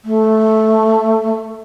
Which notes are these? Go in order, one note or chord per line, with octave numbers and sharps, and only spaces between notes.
A3